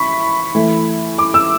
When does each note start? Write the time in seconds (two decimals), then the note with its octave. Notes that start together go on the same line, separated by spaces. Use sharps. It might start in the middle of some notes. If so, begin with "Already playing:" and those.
Already playing: E3 E4 B5 C#6
0.55 E3 A3 E4
1.18 D6
1.34 E6